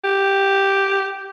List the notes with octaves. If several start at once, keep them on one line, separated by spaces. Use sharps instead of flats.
G4